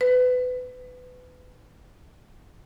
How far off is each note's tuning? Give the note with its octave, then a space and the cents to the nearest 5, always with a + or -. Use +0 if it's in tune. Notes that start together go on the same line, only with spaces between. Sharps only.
B4 +25